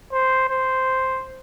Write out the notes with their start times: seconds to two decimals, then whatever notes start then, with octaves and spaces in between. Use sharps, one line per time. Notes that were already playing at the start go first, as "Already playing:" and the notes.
0.13 C5
0.50 C5